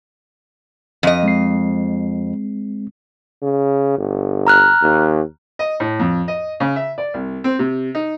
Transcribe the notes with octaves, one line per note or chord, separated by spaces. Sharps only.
F2 D#5
G#3 C4 C7
C#3
G1
A#5 F6 F#6
D#2
D#5
A2
F2
D#5
C#3
E5
D5
C2
C4
C3
D#4